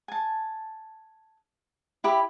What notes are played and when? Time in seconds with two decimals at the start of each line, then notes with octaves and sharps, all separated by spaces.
0.08 G#5 A5
2.04 E4 G4 B5